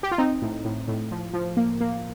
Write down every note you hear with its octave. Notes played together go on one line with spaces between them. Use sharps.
G4
F4
C4 D#4
A2
A2
A2
F3
F3
A#3
A#3